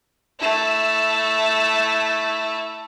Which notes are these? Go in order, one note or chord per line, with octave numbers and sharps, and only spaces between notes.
A3 E4